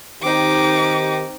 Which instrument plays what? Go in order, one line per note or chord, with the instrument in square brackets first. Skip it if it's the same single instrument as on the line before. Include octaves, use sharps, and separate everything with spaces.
[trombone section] D#3 G4 [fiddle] C4 D#4 [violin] D6